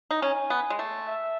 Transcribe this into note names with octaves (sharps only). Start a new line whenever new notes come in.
D#4
C#4 G#5
B3
G#3
A3
E5